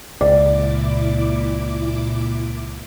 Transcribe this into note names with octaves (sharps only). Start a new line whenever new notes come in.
C#2 A#2 E4 D5 D6